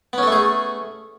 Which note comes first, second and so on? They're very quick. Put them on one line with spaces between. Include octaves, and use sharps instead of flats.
B3 C#4 A4 A3 G#4